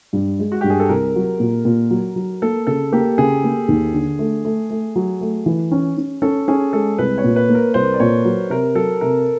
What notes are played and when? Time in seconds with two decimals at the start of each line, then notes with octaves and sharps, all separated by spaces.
0.13 G2
0.39 G#3
0.52 F#4
0.61 G2 G4
0.70 G#4
0.80 A4
0.89 C2 A#4
1.16 F#3
1.40 A#2
1.65 A#2
1.90 F#3
2.16 F#3
2.42 A#3 A4
2.67 C#3 A4
2.92 A#3 G4
3.18 C#3 G#4
3.44 A#3
3.68 D#2
3.94 D3
4.19 A3
4.45 A3
4.70 A3
4.96 F#3
5.21 A3
5.46 E3
5.72 C#4
5.97 C#4
6.22 C#4 A4
6.48 C#4 G#4
6.73 G#3 A4
6.98 C2 B4
7.18 C#5
7.24 A#2
7.36 B4
7.49 A#3
7.55 A#4
7.74 C2 C5
7.94 D5
8.00 A#2 C#5
8.25 F#3
8.50 C3 A#4
8.75 F#3 A4
9.01 C3 A#4